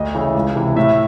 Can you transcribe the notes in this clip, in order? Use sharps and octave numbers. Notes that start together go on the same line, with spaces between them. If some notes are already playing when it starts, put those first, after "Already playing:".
Already playing: D2 D#5
C#3 E3 A3
C#2
C3 E3
A2 E5